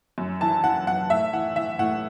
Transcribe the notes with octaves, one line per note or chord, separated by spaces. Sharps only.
F#2
E3 A5
E3 F#5
F#2 F#5
A2 E5
E3 F#5
E3 E5
A2 F#5